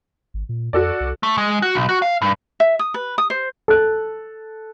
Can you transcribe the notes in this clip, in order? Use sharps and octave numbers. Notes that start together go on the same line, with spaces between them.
G#1
A#2
F2 F#4 A4 D5
C2
A3
G#3
F#4
B1
F#4
F5
G2
E5
D#6
B4
D#6
C5
A4 F#6